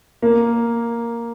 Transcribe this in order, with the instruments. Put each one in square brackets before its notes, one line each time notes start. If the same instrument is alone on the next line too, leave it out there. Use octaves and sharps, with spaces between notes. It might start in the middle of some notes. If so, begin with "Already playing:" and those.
[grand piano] A#3